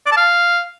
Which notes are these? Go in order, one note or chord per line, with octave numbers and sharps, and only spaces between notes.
D5
A5
F5